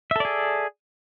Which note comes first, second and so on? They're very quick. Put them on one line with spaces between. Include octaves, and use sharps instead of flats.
E5 A4 D5 G#4